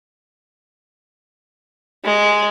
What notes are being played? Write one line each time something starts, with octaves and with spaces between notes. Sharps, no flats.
G#3